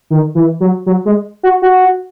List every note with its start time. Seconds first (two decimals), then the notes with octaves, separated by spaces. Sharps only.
0.10 D#3
0.35 E3
0.60 F#3
0.86 F#3
1.05 G#3
1.43 F#4
1.62 F#4